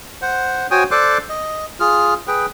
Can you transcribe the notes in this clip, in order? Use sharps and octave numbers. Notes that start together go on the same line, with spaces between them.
C5 F#5
F#4 C5 C#5 G5 G#5 D#6
A4 C5 D5 C6 D6 F#6
D#5
F4 G#4 F6
G#4 B4 G5